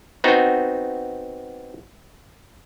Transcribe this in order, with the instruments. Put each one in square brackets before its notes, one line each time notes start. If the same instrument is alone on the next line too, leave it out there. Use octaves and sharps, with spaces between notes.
[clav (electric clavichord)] B3 C4 D#4 F#4